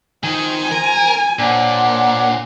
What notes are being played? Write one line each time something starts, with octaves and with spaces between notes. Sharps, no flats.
D#3 F4 C5 G#5
A#4
A#2 D4 C5 C#5 F#5